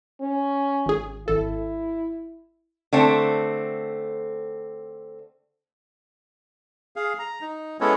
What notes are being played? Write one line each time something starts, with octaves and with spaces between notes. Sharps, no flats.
C#4
G#1 G#4
G#1 E4 A4
D3 A3 C4
G#4 F5
A#5
D#4
G#3 B3 C#4 E4 A4 C#5